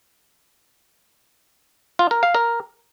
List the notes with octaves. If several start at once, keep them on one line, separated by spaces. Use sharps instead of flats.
F4
A#4
F5
A#4